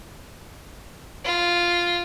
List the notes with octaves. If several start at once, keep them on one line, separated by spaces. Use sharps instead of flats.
F4